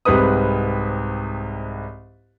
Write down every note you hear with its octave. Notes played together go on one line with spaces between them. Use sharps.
C2 G#2 C4 B4 D#6